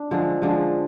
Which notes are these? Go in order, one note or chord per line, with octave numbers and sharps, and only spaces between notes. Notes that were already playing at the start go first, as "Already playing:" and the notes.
Already playing: D4
D3 F3 G#3
D3 F3 G#3